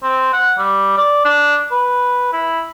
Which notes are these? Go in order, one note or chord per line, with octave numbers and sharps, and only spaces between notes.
C4
F#5
G3
D5
D4
B4
E4